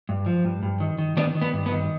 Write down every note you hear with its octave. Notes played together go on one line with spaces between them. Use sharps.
G2
F3
G2
G2
D#3
D#3
D#3 B3 D4
D#3
B3
G2
B3
D#3